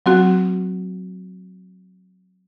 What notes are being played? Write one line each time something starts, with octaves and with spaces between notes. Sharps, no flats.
F#3 C4 F#4